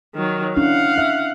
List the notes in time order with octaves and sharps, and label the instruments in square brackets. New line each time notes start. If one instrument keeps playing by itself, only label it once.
[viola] D#3 F#3
[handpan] C#4 D4 E4 [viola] F5 F#5
[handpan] E5